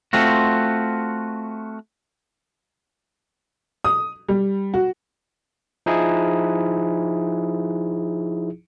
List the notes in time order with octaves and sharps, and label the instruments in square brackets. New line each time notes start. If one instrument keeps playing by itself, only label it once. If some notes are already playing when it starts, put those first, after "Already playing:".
[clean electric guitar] A3 C4 F4 F#4
[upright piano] D#6
G3
F#4
[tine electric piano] F3 D#4 E4 G#4